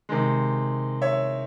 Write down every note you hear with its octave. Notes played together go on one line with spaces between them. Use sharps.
C3 D#3 G#3
C#5 E5